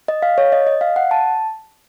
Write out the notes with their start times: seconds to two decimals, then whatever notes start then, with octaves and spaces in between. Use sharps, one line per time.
0.08 D#5
0.22 F5
0.38 C#5
0.52 D#5
0.67 D#5
0.81 F5
0.96 F#5
1.11 A5